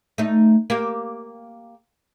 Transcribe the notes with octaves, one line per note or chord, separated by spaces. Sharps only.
A3 D#4
A#3 G4